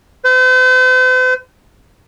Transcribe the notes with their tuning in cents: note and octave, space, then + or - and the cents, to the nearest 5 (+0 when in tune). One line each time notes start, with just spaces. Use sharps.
C5 -45